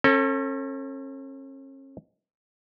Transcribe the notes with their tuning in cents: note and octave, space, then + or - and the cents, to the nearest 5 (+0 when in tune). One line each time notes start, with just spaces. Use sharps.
C#4 -40 A4 +20